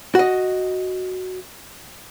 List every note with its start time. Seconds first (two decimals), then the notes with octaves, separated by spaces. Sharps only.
0.15 F#4 D#5